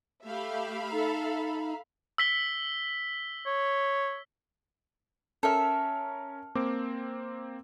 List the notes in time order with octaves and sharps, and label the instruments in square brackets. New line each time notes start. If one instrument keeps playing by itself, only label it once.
[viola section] A3 G4 [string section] E5 F5 B5
[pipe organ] D#4 [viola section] A4
[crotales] E6 B6 G7
[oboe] C#5
[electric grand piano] C#4 A#4 F6 [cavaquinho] A4 E5
[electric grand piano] A#3 C4 D6